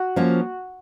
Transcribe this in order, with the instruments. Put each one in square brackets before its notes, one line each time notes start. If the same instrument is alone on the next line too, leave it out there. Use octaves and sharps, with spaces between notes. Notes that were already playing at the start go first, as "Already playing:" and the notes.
Already playing: [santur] F#4
[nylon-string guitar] F3 A#3 C#4 F4